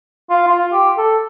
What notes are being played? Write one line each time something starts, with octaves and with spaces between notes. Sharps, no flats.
F4
F4
G4
A4